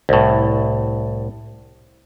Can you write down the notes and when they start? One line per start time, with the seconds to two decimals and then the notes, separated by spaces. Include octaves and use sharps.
0.09 C2 A2